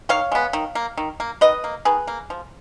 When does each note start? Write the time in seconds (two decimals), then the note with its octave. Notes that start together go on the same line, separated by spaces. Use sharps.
0.09 D#3 C#5 F5
0.32 G#3 B3
0.53 D#3
0.75 A#3
0.97 D#3
1.20 A#3
1.41 D#3 B4 D#5
1.64 A#3
1.85 D#3 G#4 B4
2.08 A#3
2.30 F3